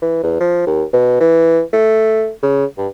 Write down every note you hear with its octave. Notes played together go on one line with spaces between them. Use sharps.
E3
E2
F3
D#2
B2
E3
A3
C#3
G2